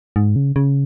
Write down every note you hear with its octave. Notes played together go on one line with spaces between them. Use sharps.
G#2
C#3
C#3